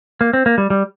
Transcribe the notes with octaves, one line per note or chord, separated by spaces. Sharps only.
A#3
C4
A#3
G3
G3